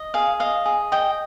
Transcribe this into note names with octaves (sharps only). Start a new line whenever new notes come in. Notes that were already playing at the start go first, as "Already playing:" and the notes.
Already playing: D#5
G#4 F5
D#5 F5
G#4
D#5 G5